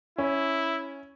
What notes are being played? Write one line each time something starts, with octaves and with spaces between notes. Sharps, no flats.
C#4 E4